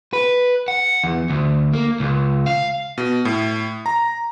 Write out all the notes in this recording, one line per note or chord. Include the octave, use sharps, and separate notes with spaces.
B4
F#5
E2
D2
A#3
C#2
F5
B2
A2
A#5